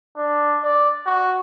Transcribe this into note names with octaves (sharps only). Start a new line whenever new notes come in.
D4
D5
F#4